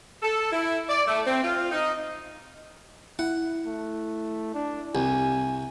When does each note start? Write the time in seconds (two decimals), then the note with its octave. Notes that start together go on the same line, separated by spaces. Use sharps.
0.23 A4
0.52 E4
0.89 D5
1.07 A3
1.27 C4
1.44 F4
1.71 D#4
3.19 E4 F#5
3.66 A3
4.54 D4
4.95 C2 G#5